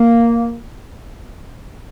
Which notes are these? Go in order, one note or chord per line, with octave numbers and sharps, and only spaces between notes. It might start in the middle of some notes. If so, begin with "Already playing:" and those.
Already playing: A#3